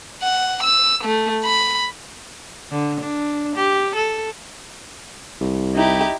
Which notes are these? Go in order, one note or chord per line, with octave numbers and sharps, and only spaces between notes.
F#5
E6
A3
B5
D3
D4
G4
A4
C2
D#4 E4 G4